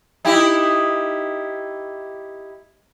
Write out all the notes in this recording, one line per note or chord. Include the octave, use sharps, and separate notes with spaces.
D#4 E4 G4